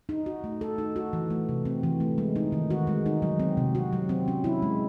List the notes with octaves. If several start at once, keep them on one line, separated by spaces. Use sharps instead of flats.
D#4
F#4
A3
A4
D#4
F#4
E3
A3
C3
C4
E3
A3
G#3
D#4
D#3
F#4
G#3
D#4
F#3
C4
C3
F#4
F#3
C4
C#4
E4
G#3